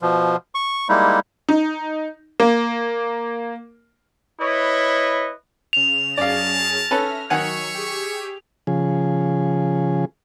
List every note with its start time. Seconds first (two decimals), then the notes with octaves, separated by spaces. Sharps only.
0.01 B2 F3
0.55 C#6
0.89 G3 G#3 A#3 D#4 E4
1.49 D#4
2.40 A#3
4.41 E4 B4 C#5 D#5
5.73 C#3 E7 F7
6.17 F#2 C#4 G#4 A#4 D5 F5 A5
6.91 C#4 A4 B4 E5 F6 A#6
7.30 D#3 F#3 C#5 E5 F#5 G#5 C#6
7.74 G4 G#4
8.67 C#3 F3 G#4